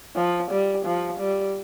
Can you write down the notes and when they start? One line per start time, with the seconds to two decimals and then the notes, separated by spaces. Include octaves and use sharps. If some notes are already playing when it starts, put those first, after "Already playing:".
0.16 F3
0.50 G3
0.85 F3
1.19 G3